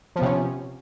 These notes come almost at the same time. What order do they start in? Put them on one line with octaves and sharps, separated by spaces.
F3 B3 C3 C#4